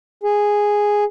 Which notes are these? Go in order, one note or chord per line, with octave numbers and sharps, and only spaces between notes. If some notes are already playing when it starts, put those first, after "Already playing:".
G#4